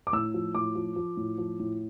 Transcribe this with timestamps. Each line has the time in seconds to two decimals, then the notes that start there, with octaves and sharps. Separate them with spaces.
0.07 D6
0.13 A2 E6
0.34 F3
0.55 A2 D6
0.75 F3
0.96 F3
1.17 A2
1.38 F3
1.60 A2